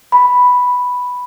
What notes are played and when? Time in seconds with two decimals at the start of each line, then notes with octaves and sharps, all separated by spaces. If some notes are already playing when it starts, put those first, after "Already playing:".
0.12 B5